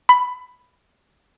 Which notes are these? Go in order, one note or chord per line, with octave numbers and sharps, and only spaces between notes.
B5